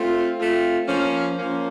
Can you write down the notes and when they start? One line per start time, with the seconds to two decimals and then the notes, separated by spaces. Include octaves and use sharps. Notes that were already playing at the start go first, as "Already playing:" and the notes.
Already playing: A3 C4 F4
0.38 A3 C4 F4
0.87 F3 A#3 C#4
1.35 F3 A#3 C#4